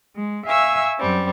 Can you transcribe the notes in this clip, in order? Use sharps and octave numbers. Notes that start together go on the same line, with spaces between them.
G#3
E5 F5 G#5 C#6 E6
F#2 G3 C4